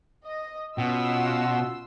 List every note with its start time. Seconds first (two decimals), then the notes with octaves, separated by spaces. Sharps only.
0.26 D#5
0.78 B2 C#4 F4 F#4 F#5 C6 E6